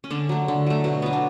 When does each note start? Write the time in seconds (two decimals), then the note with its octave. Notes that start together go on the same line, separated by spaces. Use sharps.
0.04 C#4
0.11 D3 D4
0.29 F#3 A3
0.48 D3
0.66 F#3 A3
0.84 B2 F#4
1.02 F#3 B3
1.13 D4